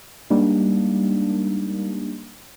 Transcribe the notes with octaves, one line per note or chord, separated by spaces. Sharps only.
G3 G#3 A#3 D4 D#4